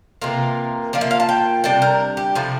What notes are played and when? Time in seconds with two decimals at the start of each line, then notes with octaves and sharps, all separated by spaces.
0.21 C3 E3 A#3 F4 A#4
0.93 F3 A#3 F4 D5
1.01 E5
1.11 F5
1.20 A5
1.29 G5
1.64 C3 G3 D4 G5
1.82 A#4
2.17 G4
2.35 C3 F3 A3 E4